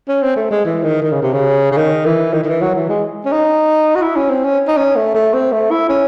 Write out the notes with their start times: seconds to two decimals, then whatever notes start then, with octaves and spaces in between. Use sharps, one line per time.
0.08 C#4
0.22 C4
0.36 A3
0.51 G#3
0.65 E3
0.83 D#3
1.02 D#3
1.12 C#3
1.22 C3
1.33 C#3
1.72 C#3
1.77 D#3
2.06 E3
2.33 D#3
2.44 D#3
2.47 E3
2.61 F#3
2.75 E3
2.89 G#3
3.25 C#4
3.32 D#4
3.96 F#4
4.02 E4
4.16 C#4
4.30 C4
4.44 C#4
4.67 D#4
4.77 C#4
4.95 A3
5.14 A3
5.33 C4
5.52 A3
5.71 E4
5.89 C#4